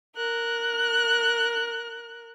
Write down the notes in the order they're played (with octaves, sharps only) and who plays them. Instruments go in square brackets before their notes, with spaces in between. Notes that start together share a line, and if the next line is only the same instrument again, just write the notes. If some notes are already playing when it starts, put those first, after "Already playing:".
[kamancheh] A#4 F#6